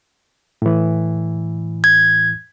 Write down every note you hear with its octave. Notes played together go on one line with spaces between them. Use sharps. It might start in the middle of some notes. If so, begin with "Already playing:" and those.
A2 E3
G#6